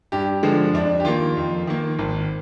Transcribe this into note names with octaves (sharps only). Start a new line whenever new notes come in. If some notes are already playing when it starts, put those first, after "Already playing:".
G2 G4
D3 F3 G#3
F2 D4
G4
D#3 A#3 F4
F2
D#3 A#3
G#1